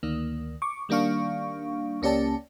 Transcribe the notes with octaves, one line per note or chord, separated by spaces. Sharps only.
D2 D#3 A#3
C#6 D6
D#3 G3 A#3 D4 F5 C#6
C#2 A#3 C#4 G4 D5 A5